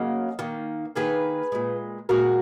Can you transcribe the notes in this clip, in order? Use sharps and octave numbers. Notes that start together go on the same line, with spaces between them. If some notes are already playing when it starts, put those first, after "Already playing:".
Already playing: C#3 F#3 A#3 D#5
D#3 A#3
D#3 A#3 G#4 B4
A#2 G#3
A#2 G#3 F#4 A#4